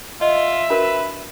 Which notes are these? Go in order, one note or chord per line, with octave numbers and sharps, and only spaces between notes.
F4 D#5 E5
D4 F#4 A#4 B4